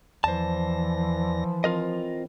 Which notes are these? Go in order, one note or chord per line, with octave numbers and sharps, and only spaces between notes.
E2 E3 F3 C5 D5 A5 A#6
C4 F4 A#4 D#5